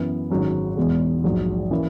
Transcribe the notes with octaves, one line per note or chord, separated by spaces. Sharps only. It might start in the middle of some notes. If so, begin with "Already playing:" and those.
Already playing: F#2 E3 B3
G#1 G#2 F#3 C#4
E1 E2 B2 G#3
A#1 G#2 F#3
E3 A#3 C#4